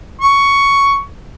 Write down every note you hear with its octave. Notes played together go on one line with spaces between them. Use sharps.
C#6